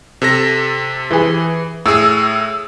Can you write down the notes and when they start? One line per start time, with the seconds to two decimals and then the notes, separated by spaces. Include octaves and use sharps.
0.22 C3 A4 A#6
1.11 E3 G#4
1.86 A2 G#4 E6